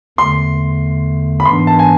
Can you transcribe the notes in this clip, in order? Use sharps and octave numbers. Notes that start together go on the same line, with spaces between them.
E2 D3 A3 C6
B5
G#2 E3 B3 D4 C6
A5
G#5